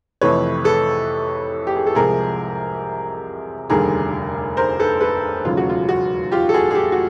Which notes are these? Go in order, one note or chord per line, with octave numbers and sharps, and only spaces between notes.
F2 C3 E3 A3 B4 C#5
A4 B4
G4
G#4
A4
C2 C3 F3 G#3 G#4 A#4
F1 D#2 D3 G3 G#4 A#4
A#4 C5
A4 B4
A4 B4
E1 D#2 C#3 F#3 A3 F4
F#4
F4
F#4
F4 G4
A4
F#4 G#4
G#4
G4 A4
F#4